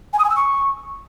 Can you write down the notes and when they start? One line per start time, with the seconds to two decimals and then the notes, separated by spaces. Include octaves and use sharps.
0.13 G#5
0.19 D#6
0.24 G#5
0.30 E6
0.35 C#6